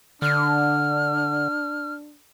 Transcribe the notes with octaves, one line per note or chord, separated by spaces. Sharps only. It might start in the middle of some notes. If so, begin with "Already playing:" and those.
D3 D4 F6